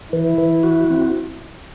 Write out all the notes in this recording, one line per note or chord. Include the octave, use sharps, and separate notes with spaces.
E3 E4
E3
F#4
C4